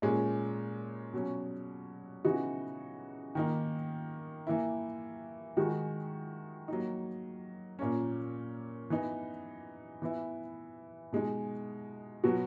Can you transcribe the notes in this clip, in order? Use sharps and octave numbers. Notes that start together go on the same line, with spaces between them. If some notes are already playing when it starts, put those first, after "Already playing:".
A#2 G#3 C#4
B2 F#3 C#4
C#3 E3 B3 D#4 F#4
D#3 A#3 D#4
E3 A#3 E4
D#3 G#3 D#4 F#4
F#3 A#3 D#4
A#2 A#3 C#4
E3 B3 D#4
E3 B3 E4
B2 G#3 D#4
B2 F#3 B3 F#4